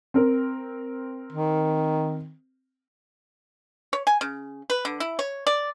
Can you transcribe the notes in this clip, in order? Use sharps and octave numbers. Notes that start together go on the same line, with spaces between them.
C4 A#4
D#3
C#5
G#5
C#3
B4
D3
E4
C#5
D5